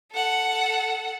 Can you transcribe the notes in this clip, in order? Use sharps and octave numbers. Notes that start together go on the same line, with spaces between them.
A4 F#5